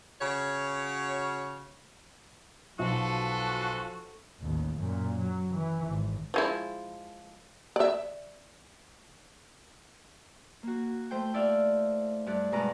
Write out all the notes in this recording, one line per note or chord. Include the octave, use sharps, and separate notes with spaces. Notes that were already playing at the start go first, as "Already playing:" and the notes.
C#3 F#4 C#5
B1 F3 F#4 A4 B4
A1 D#2
F#2 A#2
F#3
E3
G#1
F3 G#3 E4
D5 E5
A#3 F#4
A3 C5 G5
E4 D5 E5 F5
G2 D5 F#6
G2 B2 G#3 B4 A#5 D6